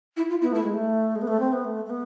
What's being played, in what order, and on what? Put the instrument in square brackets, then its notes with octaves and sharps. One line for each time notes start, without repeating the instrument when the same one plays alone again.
[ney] E4
F4
[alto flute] B3 [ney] E4
[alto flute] A3 [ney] E4
[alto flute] G#3
A3
G#3
B3
A3
C4
B3
A3
A3
B3